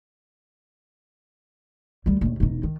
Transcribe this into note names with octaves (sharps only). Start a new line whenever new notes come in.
D2 G3
A#1 D#2
E1 D#4
D#3